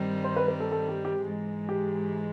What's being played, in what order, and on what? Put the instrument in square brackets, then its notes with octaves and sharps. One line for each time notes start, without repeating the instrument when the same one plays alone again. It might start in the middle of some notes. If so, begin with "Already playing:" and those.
Already playing: [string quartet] G2 D#3 G3 C4
[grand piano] C5
B4
B4
A4
A4
G4
G4
[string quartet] G#2 E3 G#3
[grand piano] G4